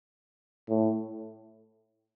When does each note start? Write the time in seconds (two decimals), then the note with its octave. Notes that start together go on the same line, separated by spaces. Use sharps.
0.69 A2